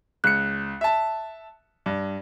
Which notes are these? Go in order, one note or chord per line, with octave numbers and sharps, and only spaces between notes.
C#2 F#6 C#7
E5 A5
G2